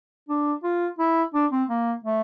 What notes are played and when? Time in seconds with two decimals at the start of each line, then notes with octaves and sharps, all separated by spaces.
0.29 D4
0.64 F4
0.99 E4
1.34 D4
1.52 C4
1.69 A#3
2.04 A3